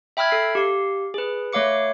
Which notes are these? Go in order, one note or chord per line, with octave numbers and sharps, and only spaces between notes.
E5 G5 B5 E6 F6 G#6
A4 C7
G4 F5
G#4 B4
A3 C#5 F5 D6 C#7